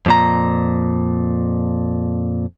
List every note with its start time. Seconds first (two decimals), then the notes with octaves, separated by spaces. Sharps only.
0.06 F2 A#2 A#5